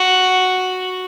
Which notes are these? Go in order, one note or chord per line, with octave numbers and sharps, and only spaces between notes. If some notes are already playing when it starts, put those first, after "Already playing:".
Already playing: F#4